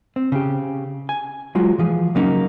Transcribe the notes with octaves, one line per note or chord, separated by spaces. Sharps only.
C4
C#3 G4
G#5
F#3 G#3 F4 F#4
E3 F3 G#4
C#3 F#3 A#3 C#4 D#4